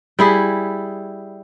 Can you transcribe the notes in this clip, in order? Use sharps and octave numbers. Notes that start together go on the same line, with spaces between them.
G3 E4 G#4